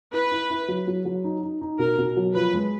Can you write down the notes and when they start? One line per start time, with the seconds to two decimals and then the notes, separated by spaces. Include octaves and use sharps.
0.13 E4 B4
0.31 E4
0.50 E4
0.68 F#3
0.87 F#3
1.05 F#3
1.24 D#4
1.43 D#4
1.61 D#4
1.79 B2 A#4
1.98 B2
2.17 F#3
2.34 F3 B4
2.54 G#3